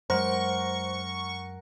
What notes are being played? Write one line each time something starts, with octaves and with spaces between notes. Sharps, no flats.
F#2 F#3 G#3 A#4 C5 F#5 C#6